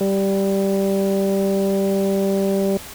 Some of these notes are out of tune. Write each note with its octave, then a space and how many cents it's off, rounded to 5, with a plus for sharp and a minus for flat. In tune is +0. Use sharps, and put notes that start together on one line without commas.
G3 -5